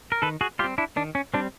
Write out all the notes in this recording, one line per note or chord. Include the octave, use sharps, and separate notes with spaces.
A#4
D#3 A4 B4
F#4 G#4
G3 C4 F4 G4
D4 E4
D#3 D4
C#4
G3 C4 D4